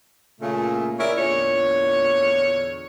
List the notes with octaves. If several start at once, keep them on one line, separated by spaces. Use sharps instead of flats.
A#2 C#3 A3
E4 G#4 A#4 C#5 D5 E5
E2 A#2 D3 C#5